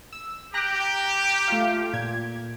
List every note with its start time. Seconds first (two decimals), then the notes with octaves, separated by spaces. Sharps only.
0.13 E6
0.54 G4 A#5 F#6
1.48 A3 F4 F5
1.93 A#2 G#6